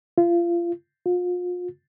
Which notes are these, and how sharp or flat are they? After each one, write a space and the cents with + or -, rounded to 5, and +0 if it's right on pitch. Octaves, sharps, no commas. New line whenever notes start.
F4 -30
F4 +35